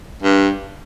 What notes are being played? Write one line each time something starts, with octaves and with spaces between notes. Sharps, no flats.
G2